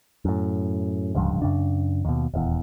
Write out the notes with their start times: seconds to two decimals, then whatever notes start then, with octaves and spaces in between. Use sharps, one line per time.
0.25 F#2 A2
1.15 D1 C#2 G2 F3
1.42 F#2 C#3 D4
2.05 D#2 B2
2.34 D#1 E2